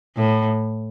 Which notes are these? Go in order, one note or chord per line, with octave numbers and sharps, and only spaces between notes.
A2